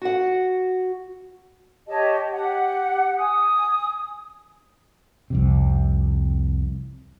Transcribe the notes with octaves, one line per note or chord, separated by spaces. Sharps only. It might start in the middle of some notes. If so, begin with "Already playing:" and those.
F#4 F#5
G4 C#5 D#5 A5
G4 F#5
G#5 D#6
C2 F2 C3